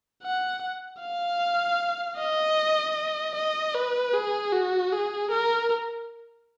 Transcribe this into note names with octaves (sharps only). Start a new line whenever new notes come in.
F#5
F5
D#5
D#5
B4
G#4
F#4
G#4
A#4